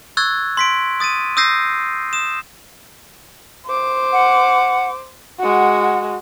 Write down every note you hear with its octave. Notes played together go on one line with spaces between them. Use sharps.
C#6 E6 F#6 G#6 A6
C6 B6 D7
D#6 A6 D7 D#7
D#6 E6 G6 A#6 C7
D#6 E7
C5 D6
F#5
G#3 F#4 F#5